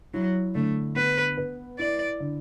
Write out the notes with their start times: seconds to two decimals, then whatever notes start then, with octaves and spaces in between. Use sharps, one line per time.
0.14 F#3 E4
0.55 D3 A3
0.96 B3 B4
1.37 B4
1.79 E4 D5
2.20 D3